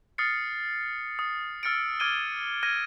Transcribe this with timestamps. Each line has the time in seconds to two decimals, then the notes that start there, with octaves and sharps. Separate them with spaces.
0.18 D#6 F6 A6 C7 C#7
1.19 D#6
1.63 E6 F6 A6 C#7 D7
2.00 D6 F6 G#6 D7 D#7 G7
2.63 F6 G#6 A#6 D#7